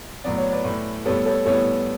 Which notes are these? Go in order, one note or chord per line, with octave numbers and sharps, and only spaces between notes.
A2 F#3 B3 D5
C#5
B4 D5
A2 E3 A3
A2 G3 B3 A4 C#5
A4 C#5
A2 E3 G3 B3 A4 C#5